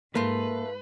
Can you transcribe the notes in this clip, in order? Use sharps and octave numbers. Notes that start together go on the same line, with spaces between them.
G#2 A3 A#3 F4 B4